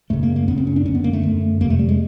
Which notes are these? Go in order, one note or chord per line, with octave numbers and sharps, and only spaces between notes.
F#2 C#3 A3
A#3
A#3
F#2 C#3 B3
C4
C#4
D4
F#2 D3 C#4
B3
A#3
A3
F#2 D3
F2 C3 A#3
A3
G3
G#3